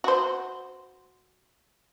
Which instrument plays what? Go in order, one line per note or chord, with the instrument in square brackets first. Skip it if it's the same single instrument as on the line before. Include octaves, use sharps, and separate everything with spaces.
[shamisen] F#4 C5